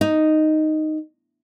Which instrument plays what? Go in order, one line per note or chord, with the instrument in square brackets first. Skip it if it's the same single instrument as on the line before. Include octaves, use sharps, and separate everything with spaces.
[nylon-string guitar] D#4